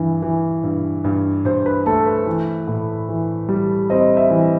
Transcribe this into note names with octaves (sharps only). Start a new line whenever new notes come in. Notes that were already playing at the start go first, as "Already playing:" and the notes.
Already playing: G2 E3
E3
G2
G2
G2 C5
B4
A3 A4
B4
E3
A2
E3
G3
C4 D#5
E5
E3